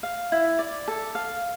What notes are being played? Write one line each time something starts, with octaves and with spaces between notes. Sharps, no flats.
F5
E4
D5
A4
F5